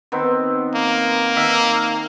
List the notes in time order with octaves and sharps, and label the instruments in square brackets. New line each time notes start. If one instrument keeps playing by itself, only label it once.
[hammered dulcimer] D#3 B3 C4
[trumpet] A#3
[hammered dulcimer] D#3 E5 F5